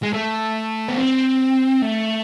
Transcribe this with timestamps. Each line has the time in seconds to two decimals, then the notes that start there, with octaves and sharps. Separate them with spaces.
0.03 G#3
0.14 A3
0.88 B3
0.97 C4
1.82 A3